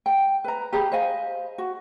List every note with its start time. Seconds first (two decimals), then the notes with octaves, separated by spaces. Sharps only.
0.06 G5
0.44 B4 A#5
0.73 G4 G#4 A#5 B5
0.92 C5 D#5 F5 G#5
1.58 F#4